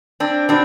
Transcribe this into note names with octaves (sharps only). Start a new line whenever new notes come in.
C4 D4
B2 C4 D4